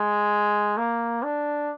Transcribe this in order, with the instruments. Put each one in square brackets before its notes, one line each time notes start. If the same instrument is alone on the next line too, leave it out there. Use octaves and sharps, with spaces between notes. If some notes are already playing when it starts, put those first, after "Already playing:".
Already playing: [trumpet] G#3
A#3
D4